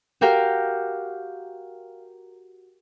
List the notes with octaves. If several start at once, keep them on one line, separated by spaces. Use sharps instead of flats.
F#4 G4 A#4 F5 G5